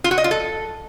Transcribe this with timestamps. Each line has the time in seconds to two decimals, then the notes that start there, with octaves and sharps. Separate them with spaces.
0.04 F4
0.11 F#4
0.18 D#5
0.24 F4
0.31 A4